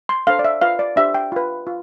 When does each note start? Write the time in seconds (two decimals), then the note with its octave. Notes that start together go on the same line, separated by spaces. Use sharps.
0.09 C6
0.27 D4 A4 C5 F5
0.39 D5
0.45 E5
0.62 F4 B4 F5
0.79 D5
0.96 D4 G4 C5 E5
1.14 G5
1.32 F4 B4
1.67 F4